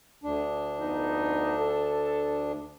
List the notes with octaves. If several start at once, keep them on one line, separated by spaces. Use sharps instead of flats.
D2 D4
F2 B3 D#4
A4